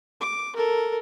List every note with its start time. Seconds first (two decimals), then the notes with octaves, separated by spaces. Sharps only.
0.21 D6
0.56 A4 A#4